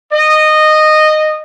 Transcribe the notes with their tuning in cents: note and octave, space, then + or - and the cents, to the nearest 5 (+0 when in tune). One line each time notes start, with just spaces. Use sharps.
D#5 -15